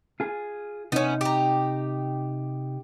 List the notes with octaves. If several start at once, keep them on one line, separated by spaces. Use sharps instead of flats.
F4 G#4
C3 B3 C#4 D#4
G4 A#5